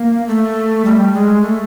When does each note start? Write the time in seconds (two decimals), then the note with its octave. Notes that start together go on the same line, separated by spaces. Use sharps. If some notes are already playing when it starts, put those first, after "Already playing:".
Already playing: A#3
0.27 A3
0.85 G3
1.13 G#3
1.41 A3